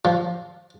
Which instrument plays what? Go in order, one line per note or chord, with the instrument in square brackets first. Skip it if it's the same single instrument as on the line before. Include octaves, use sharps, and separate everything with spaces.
[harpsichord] F3